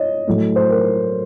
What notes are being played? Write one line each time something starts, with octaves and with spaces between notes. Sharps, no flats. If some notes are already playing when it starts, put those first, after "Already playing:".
Already playing: C#5 D#5
A2 F#3 A3
C5
A#4